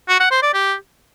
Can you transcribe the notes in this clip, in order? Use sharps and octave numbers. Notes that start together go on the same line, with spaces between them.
F#4
F#5
C5
D5
G4